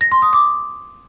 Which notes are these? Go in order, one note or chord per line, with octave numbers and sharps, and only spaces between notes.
A#6
C6
D#6
D6